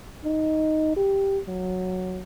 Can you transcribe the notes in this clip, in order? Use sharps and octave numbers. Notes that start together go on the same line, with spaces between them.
D#4
G4
F#3